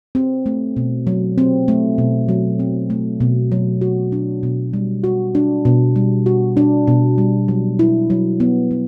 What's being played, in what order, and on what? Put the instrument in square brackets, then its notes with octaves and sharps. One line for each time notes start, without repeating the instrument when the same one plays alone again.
[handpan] C4
A3
B2
F#3
C4
A3
B2
F#3
C4
A3
B2
F#3
F#4
D4
B2
G3
F#4
D4
B2
G3
F#4
D4
B2
G3
F#3
E4
F#3
B3
F#3